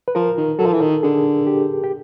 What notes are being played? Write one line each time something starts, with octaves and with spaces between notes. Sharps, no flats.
B4
F3 A#4
D#3
F#3 A4
F3
E3
D#3
D3 G#4
G4
G4